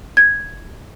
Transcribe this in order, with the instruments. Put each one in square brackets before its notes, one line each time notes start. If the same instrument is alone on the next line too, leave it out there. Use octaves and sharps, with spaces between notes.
[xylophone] G#6